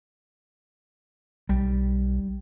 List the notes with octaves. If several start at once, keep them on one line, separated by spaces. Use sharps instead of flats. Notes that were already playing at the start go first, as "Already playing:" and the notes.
B1 G3